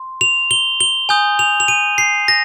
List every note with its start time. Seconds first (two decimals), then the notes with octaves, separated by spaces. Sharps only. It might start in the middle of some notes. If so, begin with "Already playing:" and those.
Already playing: C6
0.21 F7
0.51 G7
0.80 G7
1.09 G#5 D#6 G6
1.39 F7
1.60 F7
1.68 D#7
1.98 C7
2.28 A#6